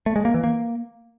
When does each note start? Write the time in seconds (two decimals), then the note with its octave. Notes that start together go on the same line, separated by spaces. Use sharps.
0.06 A3
0.16 G#3
0.25 A#3
0.34 E3
0.44 A#3